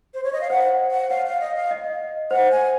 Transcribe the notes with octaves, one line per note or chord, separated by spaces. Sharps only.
C5
C#5
D#5
F5
C5 F#5
F#5
C#5 F5
F5
D#5
F5
D#5
C5 F#5
G#5